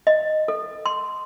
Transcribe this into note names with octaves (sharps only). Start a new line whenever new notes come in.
D#5
A4
C6